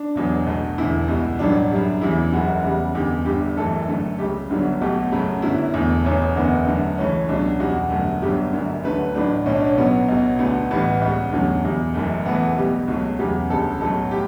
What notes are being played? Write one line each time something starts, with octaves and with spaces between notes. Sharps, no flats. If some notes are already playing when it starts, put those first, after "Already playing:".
Already playing: D4
E1 E2 B2 F#3
B1 B2 A3
E1 E2 D3 E4
C#2 B2 G3
A1 G2 F#3 D4
F#2 C#3 G3
E2 C#3 E3 G3 E4
F#1 F#2 C#3 E3 F#4
E2 C#3 G3
F#1 E2 D3 G3 G4
G1 G2 D3 G4
F#1 F#2 E3 A3 A4
F#2 D3 A3
C#2 C#3 G3 G4
G1 G2 D3 F#3
B1 B2 F#3 A3 G4
F#2 C#3 F#3 A3
G1 F#2 D3 F#3 E4
E1 E2 D3 A3
E1 E2 B2 C#4
F#1 E2 D3 B3
F#2 D3 A3
C#2 C#3 E3 A3 C#4
C#2 B2 F#3 D4
E2 B2 G3 F#4
G1 F#2 D3 A3
G1 G2 F#3 A3 G4
F#1 F#2 D3
D2 D3 F#3 A3 B4
A1 A2 F#3 A3 D4
B1 B2 A3 C#4
D4
C#4
B1 B2 F#3 B3
B1 B2 F#3
D2 D3 A3 B3
A1 A2 E3 G3 B3
C#2 C#3 G3 B3
E2 D3 F#3 A3
E2 B2 G3
F#1 F#2 E3 A3
E1 E2 C#3 E3 A3 B3
B1 B2 G3 G4
C#2 B2 F#3 A3
E2 C#3 F#3 G4
E1 D2 C#3 G3 A4
B1 A2 F#3 A3 A4
A2 G4